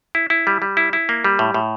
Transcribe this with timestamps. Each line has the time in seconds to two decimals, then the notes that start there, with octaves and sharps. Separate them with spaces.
0.15 E4
0.30 E4
0.47 G3
0.62 G3
0.77 E4
0.93 E4
1.09 A#3
1.24 G3
1.39 A2
1.54 A2